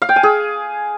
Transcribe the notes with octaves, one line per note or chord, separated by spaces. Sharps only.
F5
G5
G#5
G#4